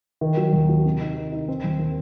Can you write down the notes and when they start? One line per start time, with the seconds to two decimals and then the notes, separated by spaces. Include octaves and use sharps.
0.21 D#3
0.37 F#3
0.53 D#2
0.69 F#3
0.85 C3
1.00 D#4
1.17 D#4
1.32 D#4
1.48 C4
1.64 D#2
1.79 D#3